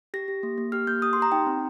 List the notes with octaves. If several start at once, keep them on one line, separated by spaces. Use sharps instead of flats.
G4 A#6
G4
A#3
A#3
G4 F6
A#3 G6
G4 D#6
G4 C6
A#5
D#4 G5
C4